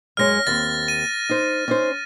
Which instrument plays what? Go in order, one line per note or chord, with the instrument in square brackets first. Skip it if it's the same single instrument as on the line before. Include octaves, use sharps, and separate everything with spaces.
[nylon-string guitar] F#2 G#3 C#5 [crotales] F6 A#6
[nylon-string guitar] D#2 C4 [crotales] A6
[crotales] D#7
[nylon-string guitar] D#4 C5
C#4 D#4 C5